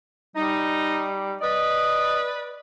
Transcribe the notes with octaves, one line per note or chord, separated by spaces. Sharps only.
G3 D#4
B4 D5 D#5